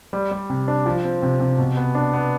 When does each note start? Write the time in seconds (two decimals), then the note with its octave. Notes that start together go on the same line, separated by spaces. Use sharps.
0.13 G3
0.31 G3
0.50 C3
0.68 D4
0.86 F3
1.04 C4
1.22 C3
1.40 C3
1.58 B2
1.77 B3
1.95 D4
2.13 B3